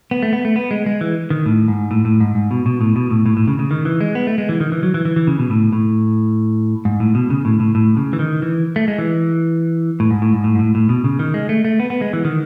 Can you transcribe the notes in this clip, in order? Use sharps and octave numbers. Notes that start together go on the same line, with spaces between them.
B3
A3
B3
A3
B3
G#3
G#3
E3
D#3
A2
G#2
A2
A2
G#2
G#2
B2
B2
A2
B2
A2
A2
A2
C#3
C#3
D#3
E3
G#3
B3
A3
G#3
E3
D#3
E3
F#3
E3
E3
E3
C#3
B2
A2
A2
G#2
A2
B2
C#3
A2
A2
A2
C#3
E3
D#3
E3
A3
G#3
E3
A2
G#2
A2
G#2
A2
G#2
A2
A2
B2
C#3
D#3
G#3
A3
A3
B3
B3
G#3
E3
D#3